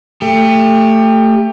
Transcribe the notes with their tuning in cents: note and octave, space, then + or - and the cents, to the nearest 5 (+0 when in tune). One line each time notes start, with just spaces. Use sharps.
A3 +20 G4 +20